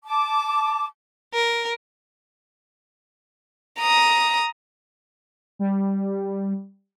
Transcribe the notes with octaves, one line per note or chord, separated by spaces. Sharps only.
A5 D6
A#4
A#5 D#6
G3